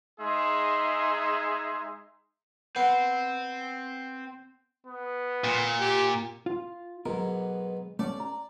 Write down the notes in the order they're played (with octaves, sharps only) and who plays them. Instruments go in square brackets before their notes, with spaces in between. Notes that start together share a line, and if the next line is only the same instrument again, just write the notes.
[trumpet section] G#3 D#4 G#4 E5 C6
[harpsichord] B3 [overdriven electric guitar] C4
[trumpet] B3
[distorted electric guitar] A#2
[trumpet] G4
[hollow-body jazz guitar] F4
[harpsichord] B1 G#2 [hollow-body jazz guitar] B3 A#4
[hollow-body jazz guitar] A3 C#4 [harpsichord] D5
[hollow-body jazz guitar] A#5